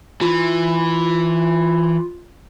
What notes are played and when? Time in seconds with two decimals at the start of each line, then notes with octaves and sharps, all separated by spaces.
0.21 E3 F4